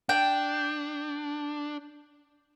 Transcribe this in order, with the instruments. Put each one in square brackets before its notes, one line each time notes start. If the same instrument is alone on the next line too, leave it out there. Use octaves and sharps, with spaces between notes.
[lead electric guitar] D4 [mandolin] G5